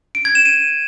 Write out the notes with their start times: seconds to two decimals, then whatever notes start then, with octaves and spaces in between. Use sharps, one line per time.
0.15 D7
0.25 G#6
0.35 E7
0.45 D#7